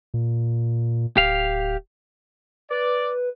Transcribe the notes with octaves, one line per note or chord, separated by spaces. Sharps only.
A#2
D1 G4 F5
B4 D5